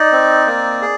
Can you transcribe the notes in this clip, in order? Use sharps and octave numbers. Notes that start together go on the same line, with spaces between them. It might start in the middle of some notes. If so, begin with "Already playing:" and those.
Already playing: D#4 D5
C4
A#3
G#4